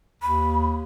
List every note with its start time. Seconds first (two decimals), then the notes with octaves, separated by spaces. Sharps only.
0.22 D#2 B5